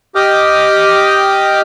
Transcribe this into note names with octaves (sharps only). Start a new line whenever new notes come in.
G4 D#5 G5 D6 D#6 F6